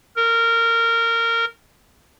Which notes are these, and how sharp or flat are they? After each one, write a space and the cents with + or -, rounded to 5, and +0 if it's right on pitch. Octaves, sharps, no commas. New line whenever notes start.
A#4 -20